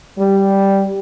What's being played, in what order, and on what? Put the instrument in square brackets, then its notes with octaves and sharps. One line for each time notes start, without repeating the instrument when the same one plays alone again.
[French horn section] G3